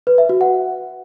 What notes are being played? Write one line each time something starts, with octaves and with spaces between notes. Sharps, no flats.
B4
E5
F#4
F#5